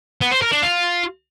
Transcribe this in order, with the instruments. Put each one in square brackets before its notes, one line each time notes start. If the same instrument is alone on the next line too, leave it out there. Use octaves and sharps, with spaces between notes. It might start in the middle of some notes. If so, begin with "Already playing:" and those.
[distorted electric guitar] B3
C5
A#4
D4
F4